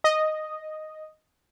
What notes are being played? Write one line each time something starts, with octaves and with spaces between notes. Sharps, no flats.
D#5